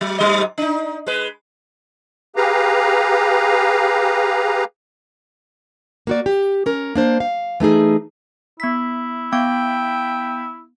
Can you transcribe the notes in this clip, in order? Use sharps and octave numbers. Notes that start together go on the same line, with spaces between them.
F#3
G#2 F#3 D#5
D4 D#4
G#3 B4
G4 G#4 B4 F5 A#5
A#3 F#4 D5
G4
C#4 A#4
A#3 D4 C5
F5
E3 A3 D#4 G#4
B3 E4 B6
B3 F5 G5 D6